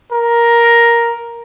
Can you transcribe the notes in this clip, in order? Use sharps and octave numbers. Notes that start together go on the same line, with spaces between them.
A#4